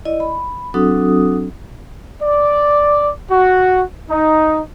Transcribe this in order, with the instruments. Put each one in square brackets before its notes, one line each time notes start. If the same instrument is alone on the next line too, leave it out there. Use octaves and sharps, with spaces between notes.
[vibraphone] E4 D5 D#5
B5
F#3 C4 D4 F#4 A4 D#6
[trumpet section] D5
F#4
D#4